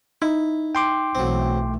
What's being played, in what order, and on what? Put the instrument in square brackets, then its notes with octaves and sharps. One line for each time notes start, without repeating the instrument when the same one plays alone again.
[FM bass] D#4 [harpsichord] E4
[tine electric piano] G5 C6 D6
[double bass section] B1 E3 A3 [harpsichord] F#3 C4